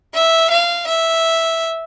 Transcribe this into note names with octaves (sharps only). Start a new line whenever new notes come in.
E5
F5
E5